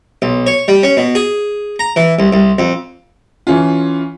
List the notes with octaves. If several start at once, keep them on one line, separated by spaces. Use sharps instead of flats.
B1
C#5
G3
C#4
B2
G#4
A#5
E3
C2
C2
F2
E3 C#4 F4